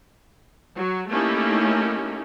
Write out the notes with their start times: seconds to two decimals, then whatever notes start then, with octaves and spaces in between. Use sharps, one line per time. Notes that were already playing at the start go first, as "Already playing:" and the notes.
0.76 F#3
1.10 A3 A#3 C#4 D#4 E4 G4